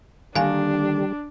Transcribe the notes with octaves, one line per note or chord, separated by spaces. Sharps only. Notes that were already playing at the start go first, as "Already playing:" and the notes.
D3 D#3 G3 A#3 D4 F5 G#5